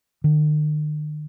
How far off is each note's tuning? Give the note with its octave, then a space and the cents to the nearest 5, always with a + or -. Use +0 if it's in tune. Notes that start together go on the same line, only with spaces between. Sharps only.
D#3 -45